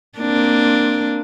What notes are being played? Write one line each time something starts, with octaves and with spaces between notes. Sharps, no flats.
A#3 C4 D4